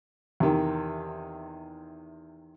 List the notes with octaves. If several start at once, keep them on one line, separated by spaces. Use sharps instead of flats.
E2 C3 D#3